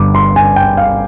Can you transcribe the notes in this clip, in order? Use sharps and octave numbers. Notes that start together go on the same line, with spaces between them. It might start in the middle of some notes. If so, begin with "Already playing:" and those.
Already playing: G1 G2 D3 D6
C6
G#5
G5
F5